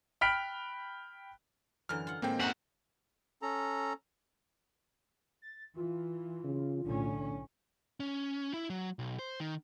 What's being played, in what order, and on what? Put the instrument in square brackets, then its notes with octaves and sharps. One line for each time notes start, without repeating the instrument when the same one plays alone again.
[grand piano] G5 B5 F6 F#6 B6 D7
[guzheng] F#2 D3 E3 [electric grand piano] F6
[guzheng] F4 F#5
[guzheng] A2 G#3 [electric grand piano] A#3 C4 G5
[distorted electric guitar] F#2 F#5 [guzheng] D#4 F#4 A#4
[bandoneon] C#4 A4 A#5
[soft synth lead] A6
[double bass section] E3 [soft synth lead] F4
[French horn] C#3
[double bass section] B1 A2 C#4 [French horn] D3
[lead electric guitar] C#4
E4
F#3
B1
C5
D#3